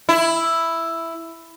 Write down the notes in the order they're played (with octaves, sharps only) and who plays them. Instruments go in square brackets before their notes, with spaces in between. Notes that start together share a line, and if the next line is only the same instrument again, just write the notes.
[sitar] E4